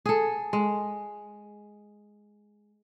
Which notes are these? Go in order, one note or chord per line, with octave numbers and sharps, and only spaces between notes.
G#4 A4
G#3